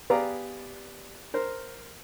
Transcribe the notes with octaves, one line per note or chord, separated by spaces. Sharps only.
B3 G4 G#4 D5 F5 A#5
A#4 C5